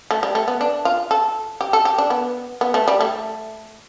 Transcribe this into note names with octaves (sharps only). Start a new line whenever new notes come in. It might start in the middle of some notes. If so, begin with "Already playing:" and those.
A3
G3
A3
B3
D4
F4
A4
G4
A4
G4
D4
B3
B3
A3
G3
A3